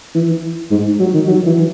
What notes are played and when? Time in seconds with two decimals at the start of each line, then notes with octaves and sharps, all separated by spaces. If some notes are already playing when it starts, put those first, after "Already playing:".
0.15 E3
0.71 G#2
1.00 F#3
1.14 D#3
1.27 F#3
1.46 E3